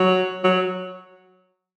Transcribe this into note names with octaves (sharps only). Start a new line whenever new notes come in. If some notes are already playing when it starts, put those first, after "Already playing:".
Already playing: F#3
F#3